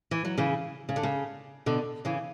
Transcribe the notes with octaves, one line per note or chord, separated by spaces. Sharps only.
E3
F#3
C#3 E3
C#3
D3
C#3
B2 D3
C#3 E3